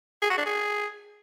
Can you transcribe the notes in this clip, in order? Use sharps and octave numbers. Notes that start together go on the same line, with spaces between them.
G#4
F#4
D4
G#4